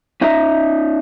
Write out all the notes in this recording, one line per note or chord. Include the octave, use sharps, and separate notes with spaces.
C#4 D#4 E5 A#5